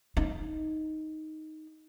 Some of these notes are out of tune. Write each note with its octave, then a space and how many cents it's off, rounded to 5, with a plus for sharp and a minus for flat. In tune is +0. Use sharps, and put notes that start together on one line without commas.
D#4 +5